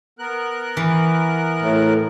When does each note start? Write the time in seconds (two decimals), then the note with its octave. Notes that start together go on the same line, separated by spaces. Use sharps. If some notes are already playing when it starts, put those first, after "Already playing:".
0.19 B3 A#4 F#6
0.77 E3
1.63 A2